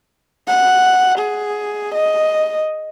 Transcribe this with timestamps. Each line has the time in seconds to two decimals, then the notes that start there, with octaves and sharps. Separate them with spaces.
0.47 F#5
1.18 G#4
1.95 D#5